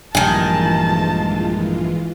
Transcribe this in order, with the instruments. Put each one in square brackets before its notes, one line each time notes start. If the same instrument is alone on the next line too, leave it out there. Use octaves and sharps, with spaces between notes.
[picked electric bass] A#1 G2 [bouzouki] D#3 G#5 [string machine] E3 G#3 F4 [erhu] A5